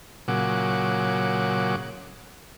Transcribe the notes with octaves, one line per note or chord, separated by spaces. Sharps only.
A#2 C#3 F#3 F#5 D6